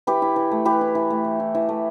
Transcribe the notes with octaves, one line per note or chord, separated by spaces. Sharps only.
E3 G4 B4
E4
E3
A3
E3 G4 B4
E4
E3
A3
E3
E4
E3
A3